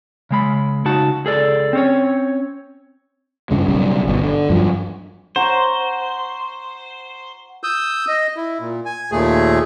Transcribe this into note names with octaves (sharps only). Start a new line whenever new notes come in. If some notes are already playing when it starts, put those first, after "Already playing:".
C#3 G#3 B5
C#3 D#4 F#4 A5
C#2 G#4 A4 D5
C4 C#4 C#5
G2 C#3 G#3
B1 C#3 G3
G1 B2
D3
G2 F3 F#3
C5 F#5 A#5 C#6
D#6 E6 G6
D#5
E4
A#2
G#5
D#2 A#2 A3 G#4